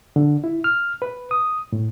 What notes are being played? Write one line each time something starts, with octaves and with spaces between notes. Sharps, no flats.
D3
E4
F6
B4
D#6
A2